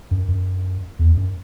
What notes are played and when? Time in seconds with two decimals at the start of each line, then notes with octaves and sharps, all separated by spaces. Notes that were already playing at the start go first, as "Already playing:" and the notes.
0.11 F#2
0.28 F#2
0.99 E2
1.17 F#2